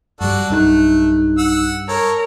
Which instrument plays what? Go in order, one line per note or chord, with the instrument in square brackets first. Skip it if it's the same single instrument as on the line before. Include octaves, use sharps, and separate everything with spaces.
[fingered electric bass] G2 G3 [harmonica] D4 F#4 A4
[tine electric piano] B1 D#4 F#6 [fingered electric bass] G2 [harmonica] A3
[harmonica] F#5 E6
[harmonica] A4 C#5 [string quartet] A#4